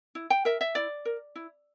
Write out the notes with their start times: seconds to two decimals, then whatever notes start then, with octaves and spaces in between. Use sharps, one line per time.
0.15 E4
0.30 G5
0.45 A#4 E5
0.61 E5
0.75 E4 D5
1.05 A#4
1.36 E4